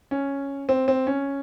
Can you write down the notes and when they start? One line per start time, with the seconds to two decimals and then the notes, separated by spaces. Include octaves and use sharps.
0.11 C#4
0.69 C4
0.88 C4
1.07 C#4